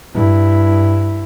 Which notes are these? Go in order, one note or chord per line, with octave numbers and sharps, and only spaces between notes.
G2 E4